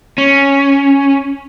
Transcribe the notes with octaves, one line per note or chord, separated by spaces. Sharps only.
C#4